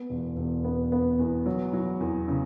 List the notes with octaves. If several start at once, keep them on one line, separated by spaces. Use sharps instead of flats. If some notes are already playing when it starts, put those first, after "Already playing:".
Already playing: B3
E1
E1
B3
B3
E2
F#3
F#3
E2
C#3